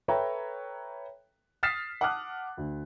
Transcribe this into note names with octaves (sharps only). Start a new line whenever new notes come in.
A4 B4 C#5 E5 G5 A#5
D#6 F6 A6 B6 C7 E7
F#5 A5 D6 D#6 F6 F#6
D2